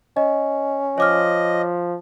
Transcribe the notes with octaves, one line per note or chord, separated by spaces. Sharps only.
C#4 D#5
F3 C#5 D#5 D6 F6